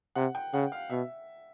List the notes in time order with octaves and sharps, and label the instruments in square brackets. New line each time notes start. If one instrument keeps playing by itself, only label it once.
[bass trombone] C3 [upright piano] F#5
[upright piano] G5
[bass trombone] C#3 [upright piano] F#5
[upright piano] F5
[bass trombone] B2 [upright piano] E5